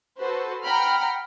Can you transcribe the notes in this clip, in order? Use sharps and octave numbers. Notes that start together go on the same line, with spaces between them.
F#4 A4 B4 C5
F#5 G5 A#5 B5 F6